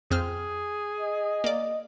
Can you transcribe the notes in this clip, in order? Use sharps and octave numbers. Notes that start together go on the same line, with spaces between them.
F2 C4 G#4 F6
D#5
A#3 D5